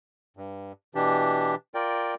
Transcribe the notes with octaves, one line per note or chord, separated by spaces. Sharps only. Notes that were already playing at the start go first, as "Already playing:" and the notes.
G2
B2 E3 D4 G4
F4 A#4 D5 G5